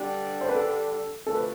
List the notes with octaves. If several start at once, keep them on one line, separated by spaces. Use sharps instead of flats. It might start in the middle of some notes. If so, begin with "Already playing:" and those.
Already playing: G2 D3 G3 D4 G4
C5
B4
A4
D2 C3 F3 A3 D4 A4
B4